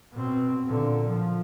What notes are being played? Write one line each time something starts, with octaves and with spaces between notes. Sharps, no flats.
B2 C4
A#2 D3
F3